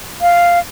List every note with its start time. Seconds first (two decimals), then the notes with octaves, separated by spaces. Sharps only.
0.21 F5